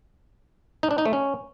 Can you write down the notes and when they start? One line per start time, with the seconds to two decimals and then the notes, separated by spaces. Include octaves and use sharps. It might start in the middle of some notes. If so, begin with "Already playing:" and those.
0.83 D#4
0.91 D4
0.98 D#4
1.06 A3
1.13 C#4